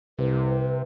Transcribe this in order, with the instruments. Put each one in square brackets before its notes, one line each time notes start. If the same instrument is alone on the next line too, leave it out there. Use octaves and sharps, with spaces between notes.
[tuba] C2 [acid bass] C3 [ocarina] B4